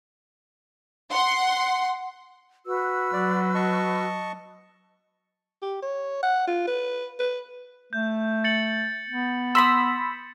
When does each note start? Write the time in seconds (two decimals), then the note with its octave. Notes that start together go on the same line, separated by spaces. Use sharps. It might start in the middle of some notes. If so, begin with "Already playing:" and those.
1.13 F#5 C6
2.65 F#4 B4 E6
3.13 F#3 D5
3.55 D#5 A5 C#6
5.62 G4
5.82 C#5
6.23 F#5
6.47 F4
6.67 B4
7.19 B4
7.93 A3 G6
8.44 A6 C#7 F#7
9.09 B3
9.55 B5 C6 D#6 E6